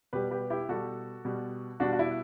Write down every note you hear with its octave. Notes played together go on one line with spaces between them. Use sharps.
B2 G3 G4 B4
G4 B4
E4 G4
B2 G3 F#4 A4
B2 G3
B2 G3 D4 F#4
F#4
E4